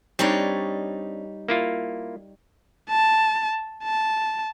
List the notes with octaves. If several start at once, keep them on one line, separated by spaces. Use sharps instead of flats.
G3 C4 D4 D#4 C#5
A#3 E4 F4
A5
A5